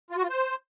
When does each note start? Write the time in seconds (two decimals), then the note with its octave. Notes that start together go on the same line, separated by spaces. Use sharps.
0.10 F4
0.17 F#4
0.23 F4
0.29 C5